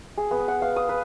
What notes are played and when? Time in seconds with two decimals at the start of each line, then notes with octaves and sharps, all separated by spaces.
0.18 G#4
0.31 B3
0.48 F#5
0.62 F5
0.76 D#6
0.89 B4